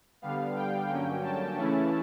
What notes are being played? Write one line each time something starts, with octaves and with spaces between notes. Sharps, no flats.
D3 G3 B3 F5
G5
G2 D3 F#3 A#3 C#4 G5
A5
C#3 E3 A3 C#4 E4